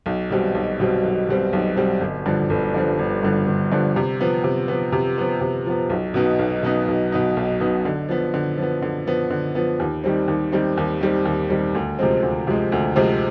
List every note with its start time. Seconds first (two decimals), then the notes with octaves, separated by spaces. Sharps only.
0.06 B1
0.30 B2 G3 C4
0.54 B1
0.80 B2 G3 C4
1.03 B1
1.29 B2 G3 C4
1.53 B1
1.76 B2 G3 C4
2.00 G1
2.26 G2 D3 F3
2.50 G1
2.74 G2 D3 F3
2.99 G1
3.23 G2 D3 F3
3.47 G1
3.72 G2 D3 F3
3.96 C3
4.20 F3 B3
4.44 C3
4.68 F3 B3
4.92 C3
5.18 F3 B3
5.41 C3
5.66 F3 B3
5.90 B1
6.14 B2 B3 D#4
6.39 B1
6.63 B2 B3 D#4
6.88 B1
7.12 B2 B3 D#4
7.36 B1
7.61 B2 B3 D#4
7.85 D3
8.09 F3 B3
8.34 D3
8.58 F3 B3
8.82 D3
9.07 F3 B3
9.30 D3
9.55 F3 B3
9.80 D#2
10.04 D#3 G3 C4
10.28 D#2
10.52 D#3 G3 C4
10.77 D#2
11.01 D#3 G3 C4
11.25 D#2
11.50 D#3 G3 C4
11.75 D2
11.99 C3 F3 G#3 C4
12.22 D2
12.47 C3 F3 G#3 C4
12.72 D2
12.96 C3 F3 G#3 C4